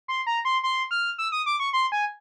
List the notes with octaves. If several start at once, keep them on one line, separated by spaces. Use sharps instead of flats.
C6
A#5
C6
C6
F6
E6
D#6
D6
C#6
C6
G#5